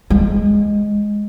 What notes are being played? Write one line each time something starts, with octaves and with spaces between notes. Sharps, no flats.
G#3